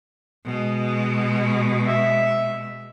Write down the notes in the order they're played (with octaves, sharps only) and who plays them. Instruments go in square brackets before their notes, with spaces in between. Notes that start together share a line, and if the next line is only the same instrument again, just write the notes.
[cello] B2 G#3
[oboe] E5